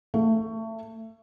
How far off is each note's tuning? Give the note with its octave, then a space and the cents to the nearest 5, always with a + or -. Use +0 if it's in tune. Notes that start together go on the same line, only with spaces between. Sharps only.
A3 +25